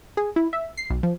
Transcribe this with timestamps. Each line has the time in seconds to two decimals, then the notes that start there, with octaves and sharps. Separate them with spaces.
0.17 G#4
0.36 E4
0.53 E5
0.77 C7
0.90 B1
1.03 F3